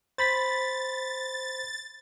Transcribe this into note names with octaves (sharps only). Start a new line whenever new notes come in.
C5 B5 A6 B6